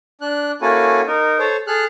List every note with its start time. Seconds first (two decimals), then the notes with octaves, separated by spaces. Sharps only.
0.21 D4 F#6
0.62 A#3 C#4 E4 F#4 A4 G#5
1.07 D#4 A#4
1.39 A4 C5 C#5
1.67 G#4 A4 F6 F#6